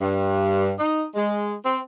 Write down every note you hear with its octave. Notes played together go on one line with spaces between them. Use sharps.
G2
D#4
G#3
C4